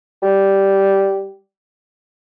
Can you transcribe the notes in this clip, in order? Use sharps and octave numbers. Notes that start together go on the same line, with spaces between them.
G3